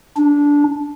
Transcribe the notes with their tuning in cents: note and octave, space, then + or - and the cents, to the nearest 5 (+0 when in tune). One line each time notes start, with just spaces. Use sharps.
D4 -15